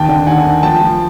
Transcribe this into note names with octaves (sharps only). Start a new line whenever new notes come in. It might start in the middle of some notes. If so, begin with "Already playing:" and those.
Already playing: D#2 G5 A5
D3
D#2 F#5 G#5
D#2
F3 G5 A5
F3